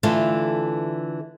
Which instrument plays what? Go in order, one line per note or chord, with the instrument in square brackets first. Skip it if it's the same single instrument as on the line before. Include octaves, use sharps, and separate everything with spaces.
[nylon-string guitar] D3 E3 A3 F4 A4